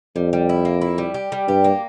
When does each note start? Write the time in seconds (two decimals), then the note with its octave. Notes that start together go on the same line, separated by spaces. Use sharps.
0.16 F2 G3
0.33 G3
0.49 E4
0.65 A#3
0.81 E4
0.98 G3
1.14 G4
1.32 G3
1.48 G2 G4
1.64 A#3